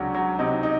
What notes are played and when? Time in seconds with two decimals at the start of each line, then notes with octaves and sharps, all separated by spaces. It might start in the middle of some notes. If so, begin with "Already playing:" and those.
Already playing: C#2 C3 F#3 C#4 D4
0.15 F#3
0.39 C3 D#4
0.63 D#4